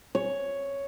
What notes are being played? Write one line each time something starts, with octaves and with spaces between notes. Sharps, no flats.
C#5